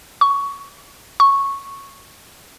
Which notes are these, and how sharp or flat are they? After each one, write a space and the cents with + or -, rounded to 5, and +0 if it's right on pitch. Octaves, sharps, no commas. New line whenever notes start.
C#6 +15
C#6 -5